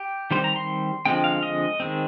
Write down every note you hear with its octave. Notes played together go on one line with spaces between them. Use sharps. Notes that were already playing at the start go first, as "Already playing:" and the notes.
Already playing: G4
D#3 G3 C4 C5
A#5
C6
D3 F3 G#3 C4 G5
F5
D#5
D#3 G#3 C4